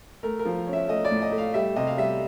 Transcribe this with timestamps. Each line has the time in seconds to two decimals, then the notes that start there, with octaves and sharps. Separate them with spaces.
0.23 A3 A#4
0.39 A#4
0.45 F3
0.67 C#4
0.73 E5
0.88 A3 D#5
1.05 D5
1.11 A2
1.22 D#5
1.32 A3
1.38 F5
1.54 G3 E5
1.76 C3 D#5
1.87 F5
1.97 G3 E5